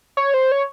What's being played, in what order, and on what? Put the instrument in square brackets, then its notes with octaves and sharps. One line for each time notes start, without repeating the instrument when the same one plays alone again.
[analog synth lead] C#5
C5
C#5